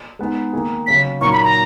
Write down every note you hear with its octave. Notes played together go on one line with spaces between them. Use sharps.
G#3 B3 D#4
D#3 A#3 D#4 G#4
C#3 F#3 C#4 B6
A#2 F#3 A#3 D#4 C#6
B5
A#5